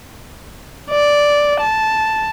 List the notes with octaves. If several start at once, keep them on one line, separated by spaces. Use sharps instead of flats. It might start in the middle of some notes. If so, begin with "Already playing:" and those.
D5
A5